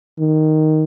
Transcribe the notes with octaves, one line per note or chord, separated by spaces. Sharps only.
D#3